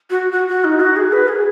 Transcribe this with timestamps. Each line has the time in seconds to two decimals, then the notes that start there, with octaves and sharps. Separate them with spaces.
0.10 F#4
0.32 F#4
0.48 F#4
0.64 D#4
0.80 F#4
0.97 G#4
1.13 B4
1.28 G#4